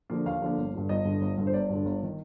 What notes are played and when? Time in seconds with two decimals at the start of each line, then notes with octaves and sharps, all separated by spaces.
0.10 D3 F3 A#3
0.25 D#2 F5
0.42 D3 F3 A#3
0.58 G1
0.74 G2 D3
0.89 G1 D#5
1.05 G2 D3
1.21 G1
1.37 G2 D3
1.47 C5
1.54 G1 D5
1.69 G2 D3
1.85 G1
2.03 D#3